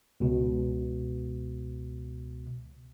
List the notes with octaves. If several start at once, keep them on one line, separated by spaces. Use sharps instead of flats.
C#2 B2